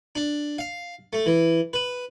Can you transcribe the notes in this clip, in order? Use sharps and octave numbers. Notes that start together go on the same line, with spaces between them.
D4
F5
A3
E3
B4